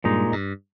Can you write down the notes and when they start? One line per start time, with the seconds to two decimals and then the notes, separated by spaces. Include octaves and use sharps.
0.04 G2 A#2 G#3 D#4
0.32 G2